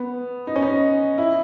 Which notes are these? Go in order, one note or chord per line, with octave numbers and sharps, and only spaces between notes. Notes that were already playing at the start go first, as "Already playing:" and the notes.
Already playing: B3
D#4
C#4
D#4
E4